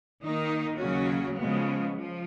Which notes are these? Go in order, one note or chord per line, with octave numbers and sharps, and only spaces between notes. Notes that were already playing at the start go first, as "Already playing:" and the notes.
D#3 A#3 D#4
D#2 C#3 F#3 C#4 F#4
C#3 F3 G#3 B3
F3